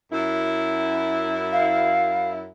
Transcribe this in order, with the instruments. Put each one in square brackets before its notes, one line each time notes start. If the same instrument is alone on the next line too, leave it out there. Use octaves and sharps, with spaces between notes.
[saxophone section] F#2 E4
[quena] F5